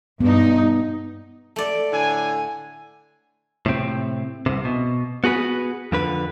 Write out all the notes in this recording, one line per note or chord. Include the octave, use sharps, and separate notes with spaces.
G2 B3 D#4
A3 D5
A2 D3 G#5
A2 C3 C4
C2 C3
B2
B3 F#4 G#4 B4
F2 D3 B4